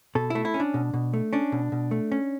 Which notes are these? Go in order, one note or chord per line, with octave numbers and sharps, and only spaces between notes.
B2 A4
A3 E4
E4
C#4
D4
B2
B2
A3
C#4 D4
B2
B2
A3
C#4